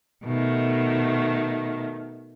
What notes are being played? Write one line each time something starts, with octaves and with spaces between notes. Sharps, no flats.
B2 D#3 A3